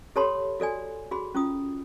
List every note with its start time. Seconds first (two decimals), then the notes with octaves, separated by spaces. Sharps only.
0.16 G4 A4 C#5 A5 B5 C6
0.60 F#4 A4 D5 G#5
1.11 F#4 G#4 B5
1.35 C#4 F4 D#6